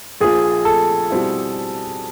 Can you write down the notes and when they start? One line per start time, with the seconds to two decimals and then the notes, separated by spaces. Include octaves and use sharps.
0.21 A#1 A#2 F3 G#4
0.65 A4
1.10 B2 G3 C4 E4